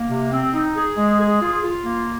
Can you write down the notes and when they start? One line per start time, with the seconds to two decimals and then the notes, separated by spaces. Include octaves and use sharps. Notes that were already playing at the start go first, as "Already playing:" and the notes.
Already playing: A#3
0.09 C3
0.31 C4
0.53 D#4
0.75 G#4
0.97 G#3
1.19 G#4
1.41 F4
1.63 F4
1.85 A#3